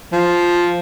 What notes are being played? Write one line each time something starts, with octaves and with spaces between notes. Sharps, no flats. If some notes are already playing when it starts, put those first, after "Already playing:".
F3